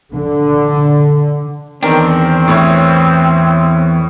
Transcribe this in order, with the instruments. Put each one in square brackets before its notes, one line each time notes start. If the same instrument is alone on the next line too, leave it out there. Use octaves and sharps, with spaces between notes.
[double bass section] D3
[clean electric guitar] E2 D4 [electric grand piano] D#3 A#4 G5 [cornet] C4
[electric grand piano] A2 E4 C#5